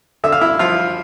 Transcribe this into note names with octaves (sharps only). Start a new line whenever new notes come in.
D3 E5
F5
E4 E5
F3 F4 F5